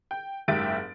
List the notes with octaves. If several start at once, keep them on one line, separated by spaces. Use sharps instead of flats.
G5
F#1 G#2 G4 E5 A6 D7